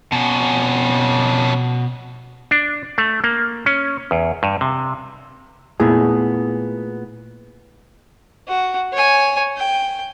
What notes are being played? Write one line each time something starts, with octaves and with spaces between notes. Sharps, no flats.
F2 B2 C#4
D4
A3
A#3
C#4
E2
G2
C3
A#2 A3 B3 E4 G#4 G#5
F#4
C#5 G#5
G5